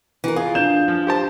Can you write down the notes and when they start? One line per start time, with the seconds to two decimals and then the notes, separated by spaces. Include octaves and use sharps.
0.24 E3 A#4
0.36 F4 G#4
0.55 D4 G6 E7
0.88 F3
1.07 G4 C5 A5